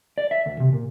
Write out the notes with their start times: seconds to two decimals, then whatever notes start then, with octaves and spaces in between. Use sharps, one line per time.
0.18 D5
0.31 E5
0.46 D2
0.60 C3
0.73 A#2